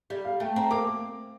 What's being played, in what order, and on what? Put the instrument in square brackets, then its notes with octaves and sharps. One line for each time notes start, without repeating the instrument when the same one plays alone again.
[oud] G3 [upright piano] D5
[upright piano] F5
[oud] A3 [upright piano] G5
[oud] C4 [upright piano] A#5
[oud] A#3 [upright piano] D6